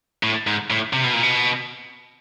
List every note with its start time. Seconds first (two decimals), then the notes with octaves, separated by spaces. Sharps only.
0.23 A2
0.47 G#2
0.70 A2
0.93 C3
1.04 B2
1.13 A#2
1.23 B2